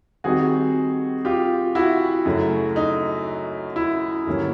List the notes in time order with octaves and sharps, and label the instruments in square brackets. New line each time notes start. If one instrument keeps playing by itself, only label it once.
[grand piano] D#3 G3 C4 D#4 F#4 G#4
F4 G4
E4 F#4
F#2 C#3 F#3 A3
D#4
E4
G2 D3 F#3 A#3 C#4